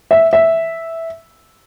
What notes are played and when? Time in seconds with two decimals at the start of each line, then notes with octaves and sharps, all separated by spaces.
0.11 E5
0.33 E5